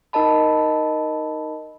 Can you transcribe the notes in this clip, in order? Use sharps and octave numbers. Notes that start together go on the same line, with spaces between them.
D#4 A#4 D#5 A5 B5